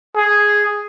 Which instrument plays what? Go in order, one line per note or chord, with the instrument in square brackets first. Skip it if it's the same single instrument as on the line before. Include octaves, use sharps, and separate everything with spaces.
[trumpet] G#4